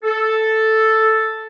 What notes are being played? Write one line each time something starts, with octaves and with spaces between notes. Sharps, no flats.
A4